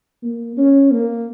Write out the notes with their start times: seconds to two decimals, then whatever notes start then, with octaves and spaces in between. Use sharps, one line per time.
0.23 A#3
0.57 C#4
0.91 A#3